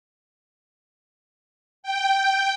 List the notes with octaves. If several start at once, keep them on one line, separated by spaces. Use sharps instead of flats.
G5